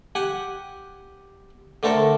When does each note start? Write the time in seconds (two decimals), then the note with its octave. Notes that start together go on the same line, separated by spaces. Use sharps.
0.15 G4 F#5 G#5
1.83 D3 A3 C4 A4 A#4